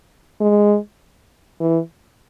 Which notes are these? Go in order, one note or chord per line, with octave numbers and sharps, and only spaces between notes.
G#3
E3